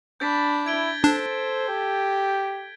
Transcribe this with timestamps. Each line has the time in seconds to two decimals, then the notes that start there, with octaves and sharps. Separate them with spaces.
0.20 D4 B5 G6 A6 B6
0.66 E4 G#6 D7 G7
1.04 D4 A4 C5
1.69 G4